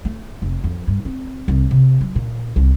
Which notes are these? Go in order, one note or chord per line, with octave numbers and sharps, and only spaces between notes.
A3
F1
F2
G2
C4
C2
C3
F#3
A#2
C2